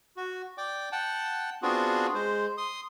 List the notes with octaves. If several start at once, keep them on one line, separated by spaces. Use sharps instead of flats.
F#4
D5 G5 D6
F#5 G5 A5
B3 C4 D4 F4 F#4 G#4
G#3 C5
C6 D#6